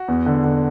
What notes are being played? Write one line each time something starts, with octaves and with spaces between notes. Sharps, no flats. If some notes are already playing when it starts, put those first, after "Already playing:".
Already playing: F#4
E2
D3
D3